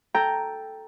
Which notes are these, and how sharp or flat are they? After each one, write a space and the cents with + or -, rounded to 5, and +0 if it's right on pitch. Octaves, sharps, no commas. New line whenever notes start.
A4 +0 G5 +0 A#5 +0